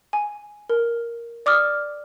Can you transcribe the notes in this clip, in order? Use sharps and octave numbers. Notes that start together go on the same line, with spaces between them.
G#5
A#4
D5 D6 D#6 F6